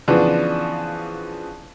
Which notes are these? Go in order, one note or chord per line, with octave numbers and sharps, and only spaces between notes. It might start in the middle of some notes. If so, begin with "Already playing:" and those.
C#3 E3 F3 B3 D4